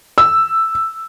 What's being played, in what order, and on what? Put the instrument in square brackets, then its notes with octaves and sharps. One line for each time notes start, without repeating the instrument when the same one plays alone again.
[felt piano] E6